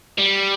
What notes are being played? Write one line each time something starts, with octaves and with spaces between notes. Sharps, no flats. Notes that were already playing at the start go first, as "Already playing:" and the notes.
G3